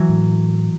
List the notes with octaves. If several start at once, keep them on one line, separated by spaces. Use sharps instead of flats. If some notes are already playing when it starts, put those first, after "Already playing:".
Already playing: E3 F#3
A2